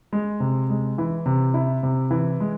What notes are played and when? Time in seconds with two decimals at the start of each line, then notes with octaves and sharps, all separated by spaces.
0.13 G#3
0.40 C3
0.70 G#3
0.98 E3
1.26 C3
1.54 E4
1.83 C3
2.11 E3
2.40 G#3